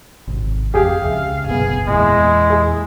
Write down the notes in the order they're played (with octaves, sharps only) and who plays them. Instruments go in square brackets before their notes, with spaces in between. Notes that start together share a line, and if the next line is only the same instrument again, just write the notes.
[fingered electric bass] G#1 C3
[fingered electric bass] F2 [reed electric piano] G4 G#4 G5 [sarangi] F5
[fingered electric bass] C#2 C#3 [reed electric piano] E5
[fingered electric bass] F#1 B2 D3 [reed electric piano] F#2 B3 [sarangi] G#4
[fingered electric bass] E2 A#2 [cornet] G#3 [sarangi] E4
[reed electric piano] G#4